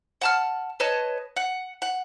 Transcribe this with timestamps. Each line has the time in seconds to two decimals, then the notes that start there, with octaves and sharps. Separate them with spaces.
0.21 F#5 A5 F6
0.80 B4 C#5 D#5 A5
1.36 F#5
1.82 F#5